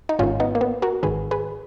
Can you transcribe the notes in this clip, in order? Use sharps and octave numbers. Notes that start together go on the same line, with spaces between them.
D#4
G#1 G#2 D#3 C#4 F4
B3 D#4
A#3
B3
F#4 A#4
G#1 G#2 D#3 G#4 B4
G#4 B4